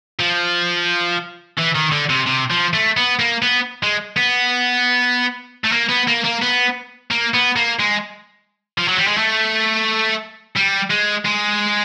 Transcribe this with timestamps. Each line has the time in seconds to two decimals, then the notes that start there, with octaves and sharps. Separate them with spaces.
0.19 F3
1.59 E3
1.75 D#3
1.92 D3
2.10 C3
2.27 C3
2.50 F3
2.73 A3
2.97 B3
3.19 A#3
3.43 B3
3.83 G#3
4.17 B3
5.64 A3
5.72 A#3
5.89 B3
6.08 A#3
6.24 A#3
6.42 B3
7.11 A#3
7.34 B3
7.56 A#3
7.80 G#3
8.78 F3
8.88 F#3
8.98 G3
9.07 G#3
9.18 A3
10.56 G3
10.91 G#3
11.25 G#3